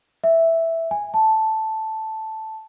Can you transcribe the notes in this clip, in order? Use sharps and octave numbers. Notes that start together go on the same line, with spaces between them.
E5
G#5
A5